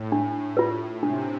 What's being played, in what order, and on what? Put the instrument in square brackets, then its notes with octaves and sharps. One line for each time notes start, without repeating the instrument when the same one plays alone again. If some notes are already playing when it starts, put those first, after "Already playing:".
Already playing: [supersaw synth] A2
[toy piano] D4
F4 B4
[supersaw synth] C3 [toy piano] D4